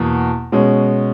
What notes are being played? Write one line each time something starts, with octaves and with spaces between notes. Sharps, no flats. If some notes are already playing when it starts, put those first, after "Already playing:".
Already playing: E2 B2 A#3
B2 G#3 C#4